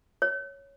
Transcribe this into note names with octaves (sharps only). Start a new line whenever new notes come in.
C#5